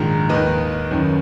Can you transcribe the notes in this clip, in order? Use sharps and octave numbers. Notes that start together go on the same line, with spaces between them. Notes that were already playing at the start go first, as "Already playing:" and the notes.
Already playing: A#1 G#2 D#3 A#4
D#2 D#3 B4 D#5
F#1 F#2 D#3